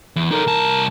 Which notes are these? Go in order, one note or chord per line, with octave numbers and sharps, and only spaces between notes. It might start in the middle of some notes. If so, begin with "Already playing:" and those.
E2
D#4 A4 A#4
C2 A5